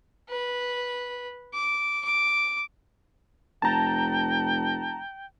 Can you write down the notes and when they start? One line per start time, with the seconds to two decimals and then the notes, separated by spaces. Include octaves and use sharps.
0.30 B4
1.54 D6
2.05 D6
3.62 F1 G5 A5 A#5